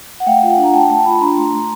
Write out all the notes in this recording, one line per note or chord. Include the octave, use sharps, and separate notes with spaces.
F#5
A3 F5 G5
F4
F#5 G#5
D4
A#5
A3 G5 A5
A3 G5 A5
F4 A5 B5
D4 A#5 C6
A3
A3